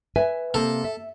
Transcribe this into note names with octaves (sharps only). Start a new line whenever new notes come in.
B4 E5 G#5
C3 A#3 A4
E5